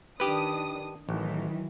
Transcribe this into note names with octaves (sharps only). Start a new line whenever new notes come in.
D#3 D4 G4 B4 D#6
A1 D#3 E3 F#3